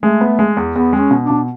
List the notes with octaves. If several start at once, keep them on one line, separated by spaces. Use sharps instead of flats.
G#3 A3
B3
G#3
E2
E2 B3
G#3 C4
C#4
B2
D4
B2